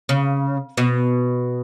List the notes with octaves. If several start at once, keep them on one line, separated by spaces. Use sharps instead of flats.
C#3
B2